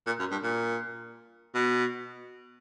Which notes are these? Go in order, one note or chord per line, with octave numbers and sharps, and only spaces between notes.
A#2
F#2
G2
A#2
B2